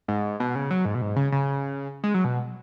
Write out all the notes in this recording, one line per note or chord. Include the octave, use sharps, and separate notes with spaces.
G#2
B2
C#3
F#3
G#2
B2
G#2
C#3
C#3
G#3
F#3
B2